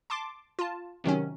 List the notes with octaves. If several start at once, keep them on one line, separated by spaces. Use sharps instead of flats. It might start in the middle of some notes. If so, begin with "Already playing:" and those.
A5 C6 D6
F4 A5
C3 D#3 F#3 C#4